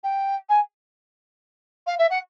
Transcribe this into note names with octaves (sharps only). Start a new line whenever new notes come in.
G5
G#5
F5
E5
F#5